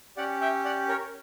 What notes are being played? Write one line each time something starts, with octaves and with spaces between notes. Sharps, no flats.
C#4 G4 D5 F#5
E5 G5
D5 F#5
A#4 C#5